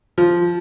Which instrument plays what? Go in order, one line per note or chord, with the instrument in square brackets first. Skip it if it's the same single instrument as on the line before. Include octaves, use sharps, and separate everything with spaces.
[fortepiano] F3